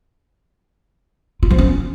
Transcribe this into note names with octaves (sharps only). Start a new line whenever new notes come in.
F4
F3
C#4